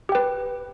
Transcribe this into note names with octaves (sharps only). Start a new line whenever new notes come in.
G4 B4 G5